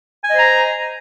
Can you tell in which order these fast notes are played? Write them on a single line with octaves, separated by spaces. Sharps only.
G#5 D#5 C5 A#5